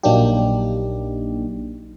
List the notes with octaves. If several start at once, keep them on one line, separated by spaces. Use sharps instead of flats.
A#1 F#3 A#3 D4 D#4 G4